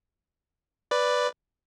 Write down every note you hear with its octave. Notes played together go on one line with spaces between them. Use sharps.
B4 D5